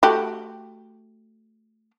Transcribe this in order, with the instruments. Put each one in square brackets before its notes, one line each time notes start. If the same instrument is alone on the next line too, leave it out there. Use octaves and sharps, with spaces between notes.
[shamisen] A3 F#4 G4